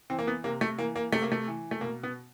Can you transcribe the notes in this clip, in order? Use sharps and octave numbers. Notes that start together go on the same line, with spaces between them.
E3 C4
A#3
B3
C3 A#3
A3
E3 A#3
A#3
C3 A3
A#3
A3
E3
A3
B2 A#3
B3